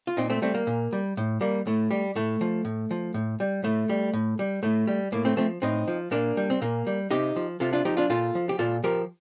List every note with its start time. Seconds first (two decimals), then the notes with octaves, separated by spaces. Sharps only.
0.07 F4
0.17 A#2 C4 D#4
0.30 A3 C4
0.42 G3 A3 C4
0.54 A#3
0.67 A#2
0.93 G3
1.17 A2
1.41 G3 A#3
1.67 A2 A3
1.91 G3
2.16 A2 A3
2.41 F3
2.65 A2
2.91 F3
3.14 A2
3.40 G3
3.64 A2 A3
3.89 G3
4.13 A2
4.39 G3
4.63 A2 A3
4.87 G3
5.12 A2 A#3
5.25 A3 C4
5.37 F3 A3 C4
5.62 A2 C4 D#4
5.88 F3
6.11 A#2 A#3 D4
6.37 G3
6.50 C4
6.62 A#2 A#3
6.87 G3
7.11 C3 D#4 G4
7.36 F3
7.60 C3 F4 A4
7.73 D4 F4
7.85 F3 D#4 G4
7.97 D4 F4
8.10 A#2 F4 A4
8.35 F3
8.49 G4
8.59 A#2 F4 A4
8.84 F3 G4 A#4